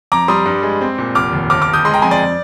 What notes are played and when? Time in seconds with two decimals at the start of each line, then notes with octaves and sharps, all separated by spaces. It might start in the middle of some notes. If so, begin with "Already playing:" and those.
0.12 F2 A#5 D6
0.28 G3 C6 D#6
0.46 G2
0.63 G#3
0.81 C4
0.98 A#2
1.15 F1 D6 F6
1.33 D#2
1.50 G1 D6 F6
1.62 D6 F6
1.67 G1
1.73 D#6 G6
1.85 G#3 C6 D#6
1.94 G5 A#5
2.02 F2 G#5 C6
2.11 D5